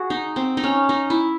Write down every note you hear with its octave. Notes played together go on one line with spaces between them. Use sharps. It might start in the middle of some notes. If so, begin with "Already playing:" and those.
Already playing: F#4 G#4
D#4
C4
D#4
C#4
D#4
E4